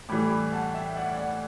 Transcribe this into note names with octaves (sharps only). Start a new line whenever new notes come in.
A2 E3 G3 B5 D6
F#5 A5
E5 G5
D5 F#5
D5 F#5